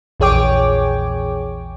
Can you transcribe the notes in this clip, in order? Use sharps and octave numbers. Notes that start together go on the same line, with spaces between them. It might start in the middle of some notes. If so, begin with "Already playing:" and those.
A#1 E2 G#4 C#5 G5 D6